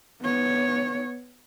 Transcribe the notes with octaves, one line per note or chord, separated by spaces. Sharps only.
B3 C#5